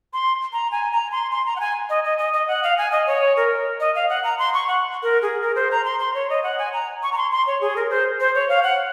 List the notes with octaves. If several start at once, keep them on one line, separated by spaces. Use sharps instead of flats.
C6
A#5
G#5
A#5
C6
C6
A#5
F#5
G#5
D#5
D#5
D#5
D#5
F#5
F5
G#5
D#5
C#5
A#4
D#5
F5
F#5
A#5
C6
C#6
F#5
A#4
G#4
A#4
C5
A#5
C6
C6
C#5
D#5
F#5
G#5
A#5
C#6
A#5
C6
C6
C#5
G#4
A#4
C5
C5
C#5
F5
F#5